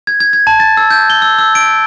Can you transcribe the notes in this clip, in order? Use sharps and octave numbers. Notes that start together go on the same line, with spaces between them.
G#6
G#6
G#6
A5
A6
E6
G6
G7
E6
E6
D7